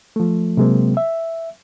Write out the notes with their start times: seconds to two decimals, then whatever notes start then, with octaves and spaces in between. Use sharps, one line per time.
0.16 F3 A3
0.57 C3 F#3 G#3 A#3 C4
0.97 E5